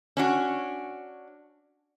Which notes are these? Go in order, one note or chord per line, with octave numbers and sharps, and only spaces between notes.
C#4 D4 F#4